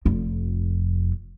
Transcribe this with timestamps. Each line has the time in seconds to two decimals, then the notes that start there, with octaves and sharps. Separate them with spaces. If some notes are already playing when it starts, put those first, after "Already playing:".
0.05 F1 F2